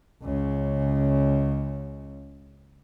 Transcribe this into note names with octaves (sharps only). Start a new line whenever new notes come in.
C#2 C#3